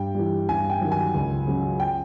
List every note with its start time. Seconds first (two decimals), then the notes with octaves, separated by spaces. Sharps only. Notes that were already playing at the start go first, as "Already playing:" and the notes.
Already playing: G2 G5
0.15 E3 G3
0.49 G2 G#5
0.70 G5
0.81 D#3 F#3
0.92 G#5
1.14 C#2
1.47 C#3 F#3
1.80 G5